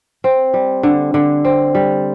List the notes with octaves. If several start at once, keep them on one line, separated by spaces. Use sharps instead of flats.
C4
G3
D3
D3
C4
G3